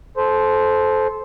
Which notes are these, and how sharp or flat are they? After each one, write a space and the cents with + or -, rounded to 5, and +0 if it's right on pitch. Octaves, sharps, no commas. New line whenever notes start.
A4 -25 C5 +0